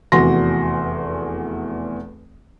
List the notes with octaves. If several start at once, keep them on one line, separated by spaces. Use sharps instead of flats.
F1 E2 F#4 C6 A#6